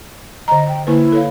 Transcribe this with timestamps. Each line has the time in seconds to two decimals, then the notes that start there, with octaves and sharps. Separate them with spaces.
0.48 D3 D#5 A#5
0.68 G5
0.87 D3 A#3 E4 B4
1.12 A4 C#5 F5